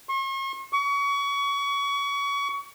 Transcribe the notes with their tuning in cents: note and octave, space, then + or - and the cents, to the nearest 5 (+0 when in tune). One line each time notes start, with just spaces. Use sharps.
C#6 -45
C#6 +30